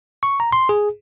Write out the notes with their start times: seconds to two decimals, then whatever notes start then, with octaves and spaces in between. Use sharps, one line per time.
0.23 C#6
0.40 A#5
0.52 C6
0.69 G#4